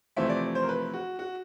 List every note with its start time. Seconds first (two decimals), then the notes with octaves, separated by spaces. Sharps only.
0.16 F2 C3 E3 A3 C4 E5
0.29 D5
0.55 C5
0.62 A#4
0.69 B4
0.94 F#4
1.19 F#4